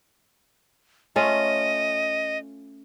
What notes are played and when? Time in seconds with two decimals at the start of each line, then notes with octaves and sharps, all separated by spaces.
1.16 A3 C#4 F4 D#5